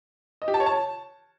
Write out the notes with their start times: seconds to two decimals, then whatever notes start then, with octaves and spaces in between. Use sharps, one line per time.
0.42 D#5
0.48 G4
0.54 A5
0.60 C#5
0.66 A5